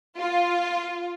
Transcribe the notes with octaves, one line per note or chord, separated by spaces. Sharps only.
F4